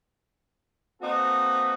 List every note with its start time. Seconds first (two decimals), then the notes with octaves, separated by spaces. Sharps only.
1.01 A#3 C4 D#4 F#4 A4 B4